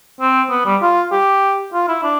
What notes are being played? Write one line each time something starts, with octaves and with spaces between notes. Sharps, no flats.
C4
B3
G3
F4
G4
F4
E4
D4